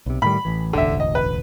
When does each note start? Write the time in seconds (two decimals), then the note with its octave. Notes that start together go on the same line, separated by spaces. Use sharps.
0.06 B1 C3
0.22 A2 D#3 G3 B5
0.45 A1 E3
0.73 E1 A1 D2 D3 E5
1.00 D#5
1.15 B4